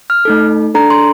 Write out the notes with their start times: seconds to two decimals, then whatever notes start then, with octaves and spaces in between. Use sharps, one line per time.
0.10 F6
0.25 A3 D#4 A4
0.74 D4 A4 A#5
0.90 C6